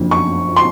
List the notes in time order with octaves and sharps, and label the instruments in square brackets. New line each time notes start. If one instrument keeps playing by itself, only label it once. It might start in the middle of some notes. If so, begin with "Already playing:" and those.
Already playing: [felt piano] F#1 F2 D3
C#6
C6